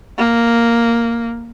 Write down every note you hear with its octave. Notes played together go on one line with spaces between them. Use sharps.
A#3